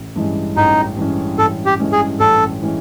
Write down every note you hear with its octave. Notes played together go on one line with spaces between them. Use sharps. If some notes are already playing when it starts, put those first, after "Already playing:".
Already playing: A1
G2 E3 G#3 C#4
A1 D#4
G2 E3 G#3 C#4
A1 A4
G4
G2 E3 G#3 C#4
G#4
A1 A4
E3 G#3 C#4